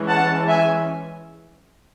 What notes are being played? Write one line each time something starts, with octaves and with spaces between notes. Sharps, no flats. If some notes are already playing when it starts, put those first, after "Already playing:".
Already playing: E3 G#3 C#4
F#5 A5
E5 G#5